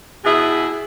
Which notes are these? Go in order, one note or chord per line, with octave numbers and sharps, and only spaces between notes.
B2 E4 G#4